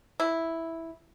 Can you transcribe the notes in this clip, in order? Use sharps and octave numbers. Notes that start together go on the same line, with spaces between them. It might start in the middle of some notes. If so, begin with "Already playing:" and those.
E4